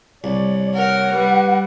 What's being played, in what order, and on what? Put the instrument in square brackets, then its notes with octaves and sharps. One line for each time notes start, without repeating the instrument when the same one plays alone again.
[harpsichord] C2 [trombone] C#5 [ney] D5
[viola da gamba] A#4 [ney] F#5
[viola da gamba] G3 [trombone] B4